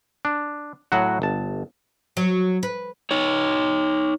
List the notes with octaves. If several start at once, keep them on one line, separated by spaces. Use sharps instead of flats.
D4
A2 F#3 F#4
G1 A5
F#3
B4
D#4 C#5